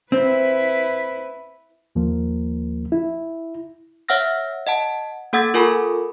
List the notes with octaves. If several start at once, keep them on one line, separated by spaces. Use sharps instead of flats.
C4 E4 B4
D#2 F3 A#3
E4
C#5 E5 F#5 E6 F6 A#6
D#5 F#5 A5
A#3 A4 F#5 E6 G#6 A6
F4 A4 A#4 G#5 B5 C#6